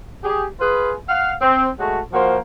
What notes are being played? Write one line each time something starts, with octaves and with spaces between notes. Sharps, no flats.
G4 G#4
F4 G#4 B4
F5 F#5
C4
G#3 A3 F#4
F3 A#3 F#4 C5